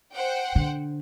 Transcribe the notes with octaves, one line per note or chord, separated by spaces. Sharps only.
C5 F#5 G5
D3